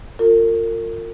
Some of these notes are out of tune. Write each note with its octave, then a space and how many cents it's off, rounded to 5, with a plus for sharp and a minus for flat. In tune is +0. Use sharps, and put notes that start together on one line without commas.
F4 +10 A#4 -40